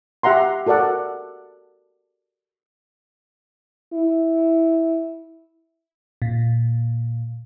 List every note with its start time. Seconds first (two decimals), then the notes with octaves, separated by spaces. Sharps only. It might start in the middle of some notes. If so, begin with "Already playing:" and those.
0.23 G4 E5 F#5 A#5 C6
0.67 F#4 A4 A#4 D5 F#5
3.93 E4
6.22 A#2